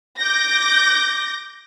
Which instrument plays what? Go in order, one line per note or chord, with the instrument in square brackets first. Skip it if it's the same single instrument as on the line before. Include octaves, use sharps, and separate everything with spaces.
[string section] D6 G6 A#6